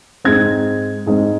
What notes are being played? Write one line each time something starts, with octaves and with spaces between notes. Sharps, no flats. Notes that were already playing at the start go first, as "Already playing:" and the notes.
G#2 G#3 C4 G#6
G#2 G#3 C4